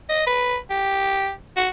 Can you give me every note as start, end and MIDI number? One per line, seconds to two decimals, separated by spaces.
0.09 0.26 75
0.27 0.58 71
0.70 1.30 67
1.57 1.69 66